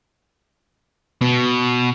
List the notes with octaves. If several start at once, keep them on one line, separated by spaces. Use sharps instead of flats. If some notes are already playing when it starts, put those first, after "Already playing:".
B2